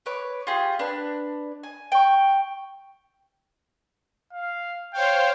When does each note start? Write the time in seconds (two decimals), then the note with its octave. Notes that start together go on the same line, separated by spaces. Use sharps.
0.06 B4 C#5 D6
0.47 F4 G4 G#4
0.79 D4 B4
1.63 G#5
1.92 G5 C#6
4.33 F5
4.93 C5 C#5 F5 G5